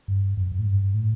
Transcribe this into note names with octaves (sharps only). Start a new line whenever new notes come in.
G2
F#2
F#2
A2
G2
A2